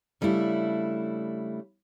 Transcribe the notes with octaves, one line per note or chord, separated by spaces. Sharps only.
C#3 G3 A3 D4 E4